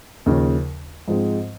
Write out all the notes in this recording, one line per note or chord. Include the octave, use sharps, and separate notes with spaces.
D#2 C#3 F3
G#2 F3 G#3 C4